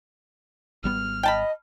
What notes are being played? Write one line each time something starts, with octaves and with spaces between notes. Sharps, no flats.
G#1 G3 B3 F6
D#5 G5 A5 B5